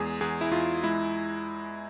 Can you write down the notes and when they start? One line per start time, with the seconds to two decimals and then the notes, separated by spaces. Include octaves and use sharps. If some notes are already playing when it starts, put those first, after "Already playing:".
Already playing: E2 G#3 G#4
0.21 E2 G#4
0.41 E4
0.51 E2 F4
0.83 G#3 E4